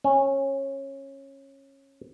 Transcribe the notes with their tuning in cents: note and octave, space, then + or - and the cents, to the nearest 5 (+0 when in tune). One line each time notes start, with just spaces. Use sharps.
C#4 -20